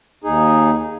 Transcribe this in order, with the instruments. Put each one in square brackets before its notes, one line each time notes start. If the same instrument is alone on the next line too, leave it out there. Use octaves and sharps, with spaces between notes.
[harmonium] D#2 D#4 G#4